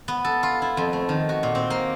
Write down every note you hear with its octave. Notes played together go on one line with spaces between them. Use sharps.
B3
A4
F4
E4
F2
A3
D#3
F#4
A#2
C4
A#3